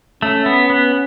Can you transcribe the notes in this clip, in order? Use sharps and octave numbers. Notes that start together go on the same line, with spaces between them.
A3 C#4
B3
B3